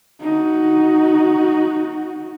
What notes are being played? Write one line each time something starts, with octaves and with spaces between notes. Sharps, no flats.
D#4 F#4